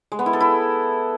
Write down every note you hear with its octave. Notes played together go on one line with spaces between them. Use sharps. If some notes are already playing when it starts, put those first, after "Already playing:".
G#3
B3
E4
A4
E4